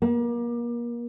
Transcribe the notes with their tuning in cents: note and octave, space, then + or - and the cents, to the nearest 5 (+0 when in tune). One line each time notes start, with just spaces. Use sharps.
A#3 +30